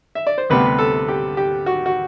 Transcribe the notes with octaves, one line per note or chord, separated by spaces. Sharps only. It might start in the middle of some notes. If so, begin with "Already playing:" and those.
E5
D5
C5
D2 C3 G3 B3 B4
A4
G4
G4
F#4
F#4